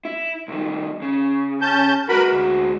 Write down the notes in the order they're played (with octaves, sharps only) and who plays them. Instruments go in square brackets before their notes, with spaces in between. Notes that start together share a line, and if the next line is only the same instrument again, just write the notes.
[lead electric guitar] E4
C2 D#3
C#3
[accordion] C#4 A5 G6
[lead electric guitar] G#3 F#4 [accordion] A#4 B4 B5
[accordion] D2